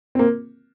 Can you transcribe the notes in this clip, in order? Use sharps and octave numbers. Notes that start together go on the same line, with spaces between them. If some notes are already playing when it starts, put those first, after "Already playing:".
C4
A#3